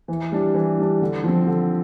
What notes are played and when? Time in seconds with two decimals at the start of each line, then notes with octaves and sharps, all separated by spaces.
0.08 E3
0.32 G3 D4
0.54 E3
0.79 G3 D4
1.02 D3
1.24 F3 C4
1.47 D3